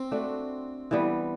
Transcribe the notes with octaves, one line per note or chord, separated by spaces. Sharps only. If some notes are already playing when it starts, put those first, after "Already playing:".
Already playing: C4
A3 D4 F#4
E3 G3 B3